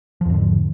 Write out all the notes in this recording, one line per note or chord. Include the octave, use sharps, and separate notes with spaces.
E2 G#2 D3 F3